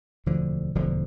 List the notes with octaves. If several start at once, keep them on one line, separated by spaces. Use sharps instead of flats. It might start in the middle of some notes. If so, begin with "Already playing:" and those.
E1 D2 D3 F3
E1 D2 D3 F3